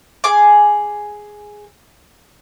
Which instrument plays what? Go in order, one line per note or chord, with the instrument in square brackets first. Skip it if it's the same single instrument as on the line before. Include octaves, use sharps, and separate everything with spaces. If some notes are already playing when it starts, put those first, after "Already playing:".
[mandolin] G#4 G#5 D6